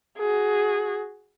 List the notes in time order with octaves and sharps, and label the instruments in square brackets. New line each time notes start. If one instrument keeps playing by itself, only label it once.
[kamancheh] F#4 G#4